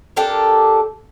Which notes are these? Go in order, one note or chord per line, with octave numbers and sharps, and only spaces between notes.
D4 G4 A4 A#4